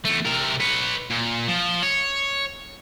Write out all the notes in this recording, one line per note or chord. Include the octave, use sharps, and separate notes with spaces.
E2 A3
C3 A#4
B4 C#5
A#2
F3
C#5